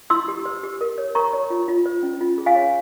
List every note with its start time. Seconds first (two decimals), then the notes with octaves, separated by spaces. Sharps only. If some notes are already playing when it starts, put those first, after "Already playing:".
0.10 E4 C6 E6
0.28 G4
0.45 C5
0.63 G4
0.81 A#4
0.98 C#5
1.15 A#4 A#5 C#6
1.33 C#5
1.50 F4
1.68 F4
1.86 C5
2.03 C#4
2.21 F4
2.38 G#4
2.46 F5 G#5
2.55 C#5